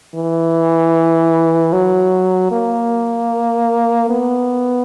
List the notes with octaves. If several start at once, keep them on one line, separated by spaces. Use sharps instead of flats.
E3
F#3
A#3
B3